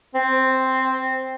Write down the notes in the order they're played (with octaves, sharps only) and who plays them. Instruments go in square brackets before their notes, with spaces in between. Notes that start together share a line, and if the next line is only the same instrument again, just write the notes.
[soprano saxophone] C4